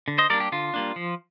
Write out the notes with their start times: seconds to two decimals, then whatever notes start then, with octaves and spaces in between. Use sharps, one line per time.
0.08 D3
0.18 C5 D#5
0.30 G3 A#3 D4 A#4 D5
0.40 G4
0.52 D3 F4
0.74 G3 A#3 D4
0.96 F3